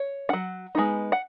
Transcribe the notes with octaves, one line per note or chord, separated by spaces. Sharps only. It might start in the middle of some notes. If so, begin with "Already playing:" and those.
Already playing: C#5
F#3 C#4 F#5
G#3 B3 D#4
F#5